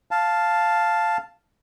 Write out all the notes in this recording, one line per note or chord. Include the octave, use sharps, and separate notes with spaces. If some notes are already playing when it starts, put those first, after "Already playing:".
F5 A5